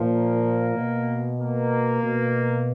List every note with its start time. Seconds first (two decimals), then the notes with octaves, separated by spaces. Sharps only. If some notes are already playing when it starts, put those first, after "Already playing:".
Already playing: A#2 F3
0.11 A#3
0.75 B2
1.39 A#3
2.03 B2